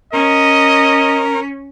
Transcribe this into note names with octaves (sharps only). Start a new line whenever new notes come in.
C#4 A#4 D#5